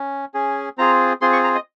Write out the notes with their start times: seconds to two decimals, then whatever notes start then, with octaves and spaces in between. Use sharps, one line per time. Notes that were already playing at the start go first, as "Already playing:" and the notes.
Already playing: C#4
0.34 C#4 G#4
0.78 C4 F4 G#4 A#5
1.21 C4 F4 G#4 C6
1.33 C#6
1.44 A#5
1.55 D#5